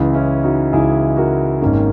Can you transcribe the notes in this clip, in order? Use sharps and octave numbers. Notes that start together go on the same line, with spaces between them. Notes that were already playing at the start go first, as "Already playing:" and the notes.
Already playing: C#2 C#3 E3
C#4 E4
D#4 F#4
C#2 C#3 E3 E4 G#4
F#4 A#4
G#1 G#2 D#3 A#3 C#4